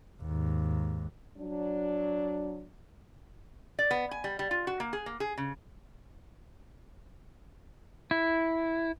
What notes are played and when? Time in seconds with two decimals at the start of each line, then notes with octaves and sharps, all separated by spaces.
0.22 D#2 G#2
1.37 F#3 D4
3.79 D5
3.91 B3
4.11 G#5
4.24 G3
4.39 G3
4.51 F4
4.67 F#4
4.80 A#3
4.93 G#4
5.06 A#3
5.20 G#4
5.38 C#3
8.11 E4